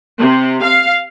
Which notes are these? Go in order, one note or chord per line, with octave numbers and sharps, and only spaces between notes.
C3
F5